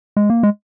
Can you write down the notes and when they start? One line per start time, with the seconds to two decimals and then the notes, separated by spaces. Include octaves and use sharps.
0.17 G#3
0.30 A#3
0.43 G#3